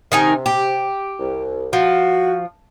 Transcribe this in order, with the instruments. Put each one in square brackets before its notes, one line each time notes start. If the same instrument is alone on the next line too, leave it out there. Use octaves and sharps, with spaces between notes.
[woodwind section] C3 [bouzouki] D#3 D#4 G#5
[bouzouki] G4
[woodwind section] C2
[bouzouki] F3 [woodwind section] F#4